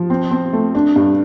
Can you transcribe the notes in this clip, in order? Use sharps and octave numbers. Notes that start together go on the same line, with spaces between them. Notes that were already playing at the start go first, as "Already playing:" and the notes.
Already playing: F3
C4
C4
A3
D4
G2